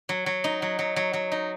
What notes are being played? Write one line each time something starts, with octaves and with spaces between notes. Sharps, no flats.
F#3
F#3
D#4
F#3
F#3
F#3
F#3
D#4